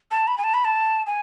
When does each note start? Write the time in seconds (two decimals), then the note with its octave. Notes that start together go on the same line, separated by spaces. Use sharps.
0.11 A5
0.27 B5
0.38 G#5
0.44 A5
0.54 B5
0.65 A5
1.06 G#5